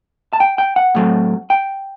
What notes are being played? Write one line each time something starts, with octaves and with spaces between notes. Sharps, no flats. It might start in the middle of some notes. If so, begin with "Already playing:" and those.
A5
G5
G5
F#5
A2 F#3 A3 C4
G5